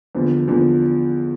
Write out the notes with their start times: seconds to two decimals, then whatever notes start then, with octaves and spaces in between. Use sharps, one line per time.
0.15 E2 D3 F3
0.48 E2 D3 F3